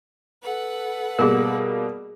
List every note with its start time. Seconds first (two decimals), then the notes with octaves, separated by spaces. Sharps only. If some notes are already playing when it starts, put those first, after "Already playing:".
0.43 A4 B4 F#5
1.19 B2 G3 A#3 G#4 A#4